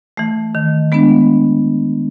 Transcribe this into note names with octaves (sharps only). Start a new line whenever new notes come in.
E3 A3
D#3
G#3 B3 D4